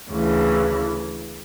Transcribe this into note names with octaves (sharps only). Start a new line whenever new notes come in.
D2 C#3 E3